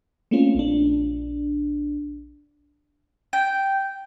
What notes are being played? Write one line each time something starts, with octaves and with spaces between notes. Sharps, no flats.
A3 A#3 C4 C#4 F4
A#1 D4
G5